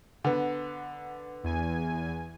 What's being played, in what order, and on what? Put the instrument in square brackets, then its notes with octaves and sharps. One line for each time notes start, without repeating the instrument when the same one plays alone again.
[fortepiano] D3 B3
[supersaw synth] E2 G#5